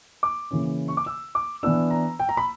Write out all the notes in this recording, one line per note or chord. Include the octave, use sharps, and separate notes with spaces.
D6
C#3 E3 A#3 C#4
C#6
D6
E6
D6
E3 B3 D4 E6
A#5
G5
A#5
B5